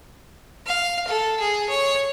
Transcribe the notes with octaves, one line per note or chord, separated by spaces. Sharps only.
F5
A4
G#4
C#5